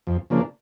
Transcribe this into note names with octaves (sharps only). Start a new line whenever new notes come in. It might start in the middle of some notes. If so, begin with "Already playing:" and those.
F2
C#3 F3 A#3 D4